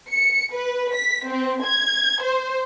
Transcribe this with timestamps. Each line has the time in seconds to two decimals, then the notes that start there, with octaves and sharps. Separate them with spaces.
0.11 C#7
0.54 B4
0.95 B6
1.27 C4
1.65 G#6
2.22 C5